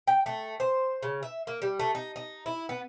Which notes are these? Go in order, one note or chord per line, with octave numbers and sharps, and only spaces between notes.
G5
A3
C5
C#3
E5
A#3
G3
A3
D#4
D#4
E4
B3